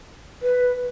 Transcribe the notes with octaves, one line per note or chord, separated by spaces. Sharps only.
B4